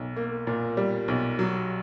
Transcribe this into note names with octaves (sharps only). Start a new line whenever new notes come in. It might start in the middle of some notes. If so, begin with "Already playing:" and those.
Already playing: B1
A#3
A#2
G3
B1
F#3